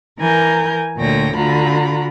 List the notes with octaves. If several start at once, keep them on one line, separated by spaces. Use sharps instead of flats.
E3 A#4 G#5 A#5 G6
D2 A#2 D3 C#5 G5 A#6
D3 F4 F#4 A#5 B5